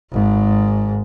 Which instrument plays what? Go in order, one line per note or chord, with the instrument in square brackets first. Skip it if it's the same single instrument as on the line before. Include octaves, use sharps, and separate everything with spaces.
[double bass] G#1 G#2